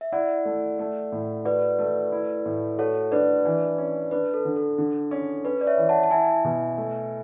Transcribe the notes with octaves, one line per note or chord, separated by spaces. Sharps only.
E5
E4 D5 F#5
A3
A3
A2
F#4 B4 D5
A3
E4
A2
F#4 A4 C#5
D4 B4 D5
E3
C#4
D4 B4
A4
D3
A4
D3
C#4
C#4 B4
D5
C#5 E5
E3
F#5 A5
A5
E4 E5 G#5
B2
A3